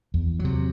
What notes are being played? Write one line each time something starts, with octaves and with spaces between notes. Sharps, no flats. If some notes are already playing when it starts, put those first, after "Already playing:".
E2
F#3
C3